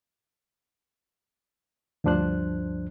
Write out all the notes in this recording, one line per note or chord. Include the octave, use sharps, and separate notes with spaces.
D2 G2 F3 D4 C5 F#6